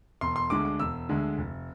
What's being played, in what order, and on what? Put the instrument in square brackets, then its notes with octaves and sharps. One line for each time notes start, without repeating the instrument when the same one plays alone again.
[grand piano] E1 [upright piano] C6
[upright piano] C6
[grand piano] D2 D3 G#3 [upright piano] D6
[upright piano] D6
[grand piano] E1 [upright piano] E6
[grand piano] D2 D3 G#3
F1